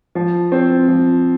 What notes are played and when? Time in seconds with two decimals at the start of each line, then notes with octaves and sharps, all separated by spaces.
0.15 F3
0.52 C4
0.88 F3